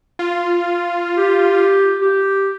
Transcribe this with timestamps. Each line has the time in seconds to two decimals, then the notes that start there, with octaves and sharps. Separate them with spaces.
0.19 F4
1.16 G4
2.01 G4